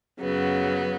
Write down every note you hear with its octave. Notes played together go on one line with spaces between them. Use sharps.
F#2 C#3 F#3 B3